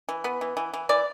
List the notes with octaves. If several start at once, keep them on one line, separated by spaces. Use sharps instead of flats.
E3
B3 B4
E3
E3
E3
E3 D5